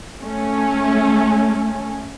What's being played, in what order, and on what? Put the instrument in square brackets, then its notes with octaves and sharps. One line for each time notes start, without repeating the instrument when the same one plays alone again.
[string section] A3 C#4